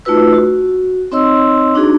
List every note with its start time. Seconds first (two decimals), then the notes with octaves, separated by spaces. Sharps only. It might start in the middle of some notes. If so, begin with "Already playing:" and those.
0.05 A3 D#4 F4 F#4 B4 E6
0.34 F#4
1.12 C4 D#4 C#5 D#5 C6 E6
1.75 D4 D#4 F#4 G#4